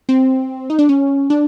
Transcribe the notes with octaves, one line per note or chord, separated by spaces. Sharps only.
C4
D#4
D4
C#4
D4